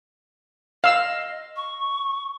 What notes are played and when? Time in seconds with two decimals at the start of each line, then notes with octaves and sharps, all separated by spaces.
0.84 D#5 F5 E6
1.56 C#6